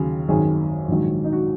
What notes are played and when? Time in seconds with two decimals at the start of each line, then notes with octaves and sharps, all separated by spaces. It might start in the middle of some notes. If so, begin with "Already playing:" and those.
Already playing: D#2 C#3 F#3
0.28 G#1 F#2 D#3 G#4
0.88 A#1 G#2 D#3 F#3
1.24 D#4
1.33 F#4